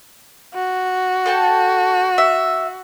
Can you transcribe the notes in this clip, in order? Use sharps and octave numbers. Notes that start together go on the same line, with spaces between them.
F#4
A4 G5 A5
E5